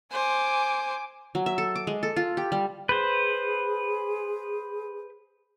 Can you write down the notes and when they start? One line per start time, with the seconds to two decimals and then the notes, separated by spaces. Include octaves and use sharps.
0.12 C5 G#5 D6
1.35 F#3
1.46 E5
1.58 A4
1.76 D6
1.87 G#3
2.03 A4
2.16 F4
2.37 G4
2.52 G3
2.89 G#4 B4 C5